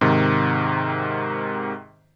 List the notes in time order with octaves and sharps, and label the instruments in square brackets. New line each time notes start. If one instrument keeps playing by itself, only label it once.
[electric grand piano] G#2 C3 D#3